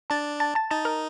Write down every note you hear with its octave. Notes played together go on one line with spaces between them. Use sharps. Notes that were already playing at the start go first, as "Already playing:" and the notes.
D4 A5 A6
A5 A6
A5 A6
D#4 A5 A6
A#4 A#5